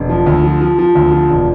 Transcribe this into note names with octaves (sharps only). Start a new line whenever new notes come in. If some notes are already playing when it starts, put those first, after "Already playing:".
Already playing: E1
F3
D2
F3
F3
F3
D2
F3
E1